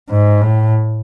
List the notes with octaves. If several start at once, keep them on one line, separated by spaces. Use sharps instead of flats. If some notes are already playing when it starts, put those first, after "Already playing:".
G#2
A2